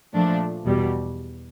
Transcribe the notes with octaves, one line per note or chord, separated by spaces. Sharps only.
A#2 F3 A3 D4
E2 B2 G3